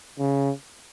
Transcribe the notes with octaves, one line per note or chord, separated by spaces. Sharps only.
C#3